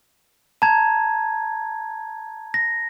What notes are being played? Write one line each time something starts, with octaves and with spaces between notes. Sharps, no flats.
A5 A#5 G#6
A#6